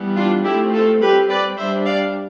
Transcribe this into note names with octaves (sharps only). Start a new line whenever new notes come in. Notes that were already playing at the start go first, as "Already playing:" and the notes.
Already playing: E3 G3 B3
D4 F4
F3 A3 C4 E4 G4
F4 A4
G3 C4 G4 B4
B4 D5
G3 D4 C5 E5
D5 F5